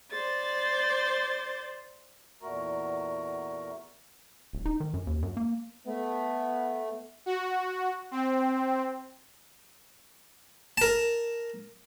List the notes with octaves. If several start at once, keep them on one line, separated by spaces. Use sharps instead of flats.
C5 D5 A6
E2 A#2 A3 F#4 A#4 A#5
D1
D#4
D#3
F#2
D#2
F#2
A#3
A3 B3
F#4
C4
A#4 A5